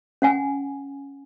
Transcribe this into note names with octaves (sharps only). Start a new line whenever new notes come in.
C#4 F#5 G#5